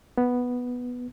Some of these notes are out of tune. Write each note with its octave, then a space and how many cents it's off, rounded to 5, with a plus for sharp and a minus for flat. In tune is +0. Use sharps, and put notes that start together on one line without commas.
B3 +0